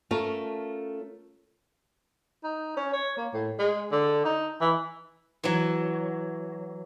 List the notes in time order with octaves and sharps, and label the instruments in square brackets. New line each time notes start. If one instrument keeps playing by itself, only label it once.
[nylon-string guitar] A3 C#4 F4 A#4
[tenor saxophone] D#4
C#4
C#5
A#3
A2
G#3
D3
D#4
E3
[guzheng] E3 F#3